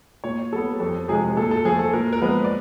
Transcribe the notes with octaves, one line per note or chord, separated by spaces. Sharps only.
A#2 C#5
G3 B3 A4
F2 A4
C3 F3 G#3 G#4
A#2 A4
A4
F3 A3 G#4
A4
A#2 A#4
A#4
F3 G#3 B3 B4
D5